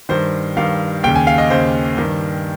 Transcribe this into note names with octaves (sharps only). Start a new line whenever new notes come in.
G2 D#3 C5
G2 D#3 F5
D#2 C#3 G5
G#5
F5
D#5
D#2 C#3 C5
G2 D#3